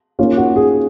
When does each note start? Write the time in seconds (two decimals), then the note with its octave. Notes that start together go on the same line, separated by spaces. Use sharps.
0.19 D#3 A#3 C#4 F4
0.37 F#4
0.56 G#4